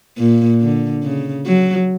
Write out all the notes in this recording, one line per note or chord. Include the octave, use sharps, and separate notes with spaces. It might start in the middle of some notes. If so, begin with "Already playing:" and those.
A#2
D3
C#3
F#3